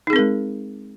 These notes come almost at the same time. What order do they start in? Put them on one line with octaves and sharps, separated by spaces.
D#4 G#4 C4 A#4 G#3